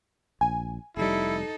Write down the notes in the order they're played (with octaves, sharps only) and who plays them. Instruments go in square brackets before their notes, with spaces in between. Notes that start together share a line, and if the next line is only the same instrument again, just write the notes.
[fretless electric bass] A#1 [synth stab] G#5
[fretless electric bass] F1 G3 [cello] D#4 A4 [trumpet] E4